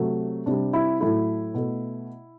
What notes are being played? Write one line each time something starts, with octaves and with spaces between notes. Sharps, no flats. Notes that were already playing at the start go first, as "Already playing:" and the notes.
Already playing: C3 F#3 A3
C3 G3 D4
E4
A2 F#3 A3 E4
B2 A3